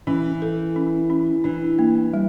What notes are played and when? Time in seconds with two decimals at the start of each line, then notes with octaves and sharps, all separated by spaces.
0.07 E3 C#4
0.42 A4
0.76 C#4
1.10 C#4
1.44 E3 D4
1.79 A#3
2.14 G3